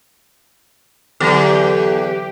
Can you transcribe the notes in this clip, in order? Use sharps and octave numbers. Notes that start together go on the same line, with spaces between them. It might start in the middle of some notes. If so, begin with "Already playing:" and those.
E2 D3 F#3 G4 A4